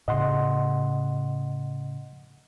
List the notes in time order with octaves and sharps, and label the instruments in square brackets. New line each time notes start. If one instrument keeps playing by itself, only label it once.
[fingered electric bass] A2 C#3 [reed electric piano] D#5 F#5 C6